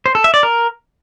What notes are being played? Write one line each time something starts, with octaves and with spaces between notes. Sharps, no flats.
C5
A4
E5
D5
A#4